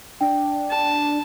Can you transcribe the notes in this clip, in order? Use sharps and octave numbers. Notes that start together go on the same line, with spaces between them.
D4 G5
A5